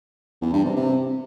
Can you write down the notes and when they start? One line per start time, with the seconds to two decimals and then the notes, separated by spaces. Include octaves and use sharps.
0.42 E2
0.53 G2
0.65 C3
0.76 C3